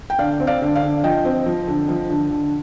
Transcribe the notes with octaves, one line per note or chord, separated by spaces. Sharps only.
G5
D3 D5 F5
C4
D5 F5
D3
D5 F5
D3
F3 D#5 G5
C4
F3
D3
F3
D3
D3